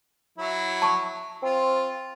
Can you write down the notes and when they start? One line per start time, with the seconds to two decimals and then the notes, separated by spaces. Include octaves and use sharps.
0.38 F#3 E4
0.82 A5 C#6
1.43 C4 F4